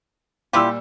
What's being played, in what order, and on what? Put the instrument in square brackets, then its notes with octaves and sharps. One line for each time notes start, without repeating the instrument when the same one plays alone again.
[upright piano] A#2 G3 E6 [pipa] E4 F4 G4